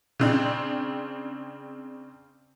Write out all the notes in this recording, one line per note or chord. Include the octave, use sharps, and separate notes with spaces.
C#3 C4 D4